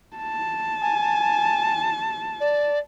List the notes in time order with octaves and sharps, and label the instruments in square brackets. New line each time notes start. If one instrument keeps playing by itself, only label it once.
[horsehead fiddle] A5
[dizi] G#5
D5